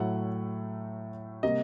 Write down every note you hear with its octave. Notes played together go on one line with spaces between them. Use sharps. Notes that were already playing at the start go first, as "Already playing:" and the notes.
Already playing: A2 F#3 A3 F#5
C3 G3 A#3 D#5